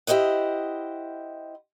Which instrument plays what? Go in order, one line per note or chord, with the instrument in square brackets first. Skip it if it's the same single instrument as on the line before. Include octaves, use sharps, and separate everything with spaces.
[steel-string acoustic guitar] E4 G4 C5 D#5 F#5